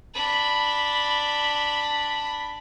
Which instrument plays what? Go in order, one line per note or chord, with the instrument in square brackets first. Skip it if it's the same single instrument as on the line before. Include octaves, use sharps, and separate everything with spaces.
[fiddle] D4 B5